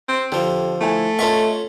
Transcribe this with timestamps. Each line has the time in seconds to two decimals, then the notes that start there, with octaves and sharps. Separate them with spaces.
0.08 C4
0.32 F2 D3 F3 G4
0.81 A3 E4 G#5
1.19 C#4 F4 A4 D#5 E5 C#6